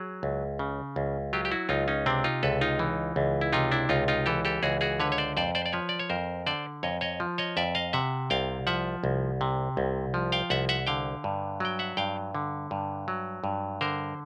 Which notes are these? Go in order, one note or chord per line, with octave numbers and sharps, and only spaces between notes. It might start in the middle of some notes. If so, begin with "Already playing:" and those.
Already playing: F#3 G#4
C#2
C#3
C#2
F#3 F4 G4
G4
E4 F#4
C#2 D#4 F4
C#4 D#4
C3 C4 D4
D#4 F4
C#2 A4 B4
D#4 F4
E3
C#2
E4
C3 D#4 F4
D4 E4
C#2 D#4 F4
D#4 F4
E3 G4 A4
G4 A4
C#2 F#4 G#4
F#4 G#4
D3 B4 C#5
C#5
C5 D5
F2 C5 D5
C5 D5
D5
F3 B4 C#5
D5
C#5
F2 A#4 C5
D3 C5 D5
F2 C#5 D#5
C#5 D#5
F3
C#5 D#5
F2 D5 E5
D#5 F5
C3 E5 F#5
C2 F5 G5
F3 E5 F#5
C2
C3
C2
F3
F5 G5
C2 E5 F#5
E5 F#5
D3 F5 G5
G2
F#3 G5
E5 F#5
G2 F5 G5
D3
G2
F#3
G2
D3 A#4 C5